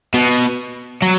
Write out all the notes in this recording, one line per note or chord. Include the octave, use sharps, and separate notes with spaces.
B2
F#3